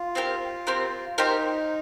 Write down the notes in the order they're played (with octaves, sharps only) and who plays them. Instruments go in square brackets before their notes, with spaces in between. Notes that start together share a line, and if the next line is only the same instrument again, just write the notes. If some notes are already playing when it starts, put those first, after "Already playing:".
Already playing: [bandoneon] F4
[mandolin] C4 G4 A#4
C4 G4 A#4
[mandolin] C4 G4 A#4 [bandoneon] D#4